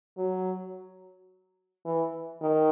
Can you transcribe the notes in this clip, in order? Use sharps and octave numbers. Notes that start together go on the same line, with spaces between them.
F#3
E3
D#3